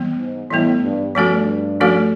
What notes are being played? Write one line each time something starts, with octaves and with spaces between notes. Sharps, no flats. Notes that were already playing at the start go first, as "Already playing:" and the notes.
Already playing: E3 G3 B3
G#2
A2 E3 G3 B3
G2
G2 F3 A3 C#4 F#4 A4
F3 A3 C#4 F#4 A4